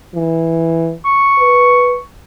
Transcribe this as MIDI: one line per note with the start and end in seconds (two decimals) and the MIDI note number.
0.14 0.92 52
1.05 2.03 85
1.38 1.94 71